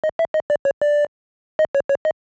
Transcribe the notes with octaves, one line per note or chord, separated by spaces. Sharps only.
D#5
E5
D#5
D5
C#5
D5
D#5
C#5
C#5
D#5